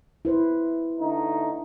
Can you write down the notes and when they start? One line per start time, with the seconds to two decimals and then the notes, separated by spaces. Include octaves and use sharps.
0.25 E4 B4 C5
1.00 D3 A3 D#4